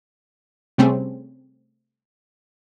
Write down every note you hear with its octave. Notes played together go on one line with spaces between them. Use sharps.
C3 G3 A3 C4 C#4 G#4